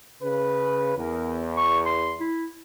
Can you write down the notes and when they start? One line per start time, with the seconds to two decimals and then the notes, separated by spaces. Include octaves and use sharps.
0.22 C#3 B4
0.97 E2 A#4
1.57 C#6
1.86 C6
2.20 E4